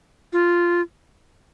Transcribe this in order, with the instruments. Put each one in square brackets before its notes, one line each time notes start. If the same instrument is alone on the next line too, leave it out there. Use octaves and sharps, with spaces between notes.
[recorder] F4